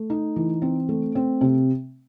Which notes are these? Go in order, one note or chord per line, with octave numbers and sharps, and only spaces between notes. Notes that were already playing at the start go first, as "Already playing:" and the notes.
Already playing: A3
D#4
E3
C4
A3
C4
C3